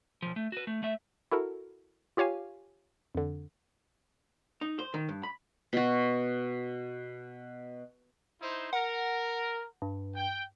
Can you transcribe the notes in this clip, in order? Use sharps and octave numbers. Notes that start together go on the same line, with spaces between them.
B1 F3
A3
F#4 B4
A3
A3 E5
E4 F#4 A4 A#4
F4 G4 C#5 F5 G#5
F2 D3
D#4
C5
D#3
G2
B5
B2 F#4
D#4 E4 C5
A#4 F#5
G2
G5